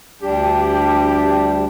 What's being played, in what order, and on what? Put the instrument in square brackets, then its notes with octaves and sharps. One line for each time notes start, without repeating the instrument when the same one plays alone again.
[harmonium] D2 G3 D4 [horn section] G4